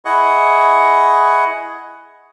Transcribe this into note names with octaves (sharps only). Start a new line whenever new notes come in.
E4 G#4 D#5 F#5 C#6